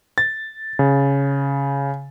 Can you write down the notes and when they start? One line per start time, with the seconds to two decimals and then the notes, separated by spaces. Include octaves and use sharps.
0.18 A6
0.79 C#3